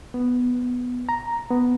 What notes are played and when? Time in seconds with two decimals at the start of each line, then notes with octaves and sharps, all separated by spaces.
0.14 B3
1.09 A#5
1.50 B3